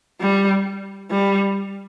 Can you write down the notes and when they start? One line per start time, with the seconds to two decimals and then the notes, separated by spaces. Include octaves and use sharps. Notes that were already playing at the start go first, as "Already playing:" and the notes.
0.21 G3
1.11 G3